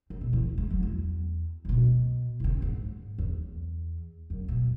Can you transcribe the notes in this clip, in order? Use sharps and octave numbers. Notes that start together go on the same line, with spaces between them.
C#3
B2
E3
G#3
F#3
E2
C#3
B2
E3
C#3
G#2
E2
F#2
B2